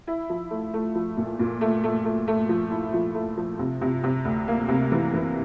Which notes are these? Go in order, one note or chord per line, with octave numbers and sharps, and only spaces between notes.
E4
F3
A3
A3
F3
A#2
A#2
A3
A3
A3
A3
F3
E4
F3
A3
F3
C3
C3
C3
D2
A#3
C3
E3
E3